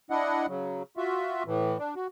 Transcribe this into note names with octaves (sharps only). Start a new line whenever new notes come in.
D4 E4 D#5 F#5
C#3 F#3
F4 F#4 E5
A2 E3
D4
F#4